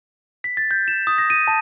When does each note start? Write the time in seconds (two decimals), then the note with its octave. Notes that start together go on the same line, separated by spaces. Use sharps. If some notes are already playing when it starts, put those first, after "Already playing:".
0.44 B6
0.57 A6
0.71 G6
0.88 E7
1.07 D#6
1.18 A#6
1.30 D#7
1.48 A5